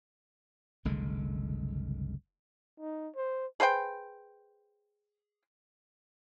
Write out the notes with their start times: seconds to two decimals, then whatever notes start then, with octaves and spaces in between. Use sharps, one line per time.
0.85 F#1 C2 D3 G#3
2.79 D#4
3.16 C5
3.60 G#4 B4 C5 G5